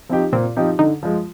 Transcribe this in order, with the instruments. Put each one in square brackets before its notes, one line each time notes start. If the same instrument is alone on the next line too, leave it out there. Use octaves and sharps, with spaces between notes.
[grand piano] F3 C4 D#4 G4
[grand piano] A#2 [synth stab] C4
[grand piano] F3 C4 D#4 G4
[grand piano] D3 [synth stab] D#4
[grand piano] F3 G#3